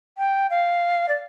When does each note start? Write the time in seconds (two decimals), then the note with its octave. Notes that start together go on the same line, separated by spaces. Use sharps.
0.18 G5
0.50 F5
1.09 D5